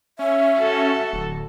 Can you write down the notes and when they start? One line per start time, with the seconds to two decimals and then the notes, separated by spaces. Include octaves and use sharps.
0.19 C#4 E5
0.57 F#4 A4
1.13 D1